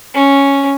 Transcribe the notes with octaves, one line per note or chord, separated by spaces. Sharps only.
C#4